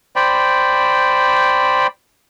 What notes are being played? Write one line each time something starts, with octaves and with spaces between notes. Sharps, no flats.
C5 D5 G5 B5